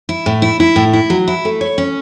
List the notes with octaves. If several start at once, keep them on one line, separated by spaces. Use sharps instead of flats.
E4
A2
E4
E4
A2
E4
F#3
E4
A3
C#5
C#4